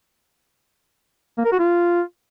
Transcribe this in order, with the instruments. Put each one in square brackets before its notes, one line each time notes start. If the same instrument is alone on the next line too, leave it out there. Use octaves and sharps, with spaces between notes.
[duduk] A#3
A#4
F#4
F4